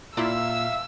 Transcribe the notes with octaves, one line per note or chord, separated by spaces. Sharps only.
A#2 E4 F4 D5 E5 F5 E6